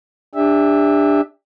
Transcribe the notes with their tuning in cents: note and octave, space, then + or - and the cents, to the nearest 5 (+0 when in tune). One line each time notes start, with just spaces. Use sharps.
D4 +0 G4 +35 E5 -10